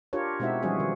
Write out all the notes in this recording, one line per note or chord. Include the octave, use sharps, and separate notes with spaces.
D4 F4 G4 A#4 C#5
B2 G#3 C4 D#4 F#4 E5
E3 F3 G3 C#4 F#4 G#4
D#3